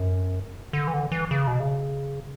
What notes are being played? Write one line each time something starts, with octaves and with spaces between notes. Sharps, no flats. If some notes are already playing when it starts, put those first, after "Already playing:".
Already playing: F#2
D3
E3
D3
E3
C#3
B2
C#3